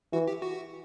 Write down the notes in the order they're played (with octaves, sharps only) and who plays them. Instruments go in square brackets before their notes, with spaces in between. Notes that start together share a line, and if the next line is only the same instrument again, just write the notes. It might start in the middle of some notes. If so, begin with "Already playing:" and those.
[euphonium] E3 [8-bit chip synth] F#4
[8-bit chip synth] G4
F#4